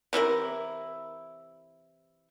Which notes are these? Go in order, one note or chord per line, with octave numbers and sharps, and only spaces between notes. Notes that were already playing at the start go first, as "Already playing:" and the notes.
C3 E3 E4 A#4